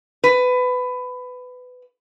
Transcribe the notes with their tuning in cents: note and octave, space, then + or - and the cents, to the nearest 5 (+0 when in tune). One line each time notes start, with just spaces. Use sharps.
B4 +20